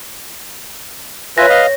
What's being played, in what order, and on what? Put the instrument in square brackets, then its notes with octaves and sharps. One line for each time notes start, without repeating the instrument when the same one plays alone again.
[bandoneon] F4 E5 G#5 [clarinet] B4 [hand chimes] C#5 A#6
[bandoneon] D#5 F5